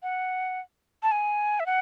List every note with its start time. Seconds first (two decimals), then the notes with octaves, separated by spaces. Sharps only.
0.03 F#5
1.03 A5
1.12 G#5
1.60 E5
1.66 F#5